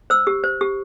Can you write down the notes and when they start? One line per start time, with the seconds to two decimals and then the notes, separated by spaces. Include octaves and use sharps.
0.10 C5 E6
0.27 G4
0.44 C5
0.61 G4